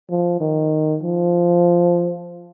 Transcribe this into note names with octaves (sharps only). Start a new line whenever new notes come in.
F3
D#3
F3